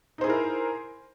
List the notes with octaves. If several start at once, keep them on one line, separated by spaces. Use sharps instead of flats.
D#4 E4 G#4 A#4 C5